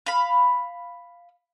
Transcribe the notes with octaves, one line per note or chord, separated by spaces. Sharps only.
F5 B5